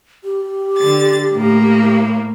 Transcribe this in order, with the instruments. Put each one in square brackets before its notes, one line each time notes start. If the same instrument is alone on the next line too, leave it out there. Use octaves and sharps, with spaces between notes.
[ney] G4
[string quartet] D3 A6
A2 A#3